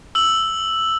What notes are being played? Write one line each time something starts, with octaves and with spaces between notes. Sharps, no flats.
E6 F#7